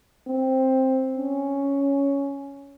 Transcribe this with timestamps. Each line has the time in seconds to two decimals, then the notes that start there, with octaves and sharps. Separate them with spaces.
0.28 C4
1.18 C#4